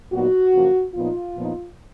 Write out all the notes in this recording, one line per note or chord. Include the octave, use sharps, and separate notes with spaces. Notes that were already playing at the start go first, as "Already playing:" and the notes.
A#2 F#3 B3 D#4 F#4
F#2 C#3 F3 A#3
A#2 F3 B3 D#4 F4
A#2 F3 B3 D#4